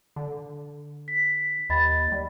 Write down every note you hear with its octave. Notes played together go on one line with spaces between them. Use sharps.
D3
B6
D#2 D#5 B5 A6
G3